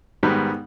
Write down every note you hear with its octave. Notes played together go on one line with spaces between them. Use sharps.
G#2 D#3 G3 B3